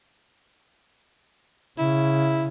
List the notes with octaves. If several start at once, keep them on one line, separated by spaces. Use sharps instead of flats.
C#3 E4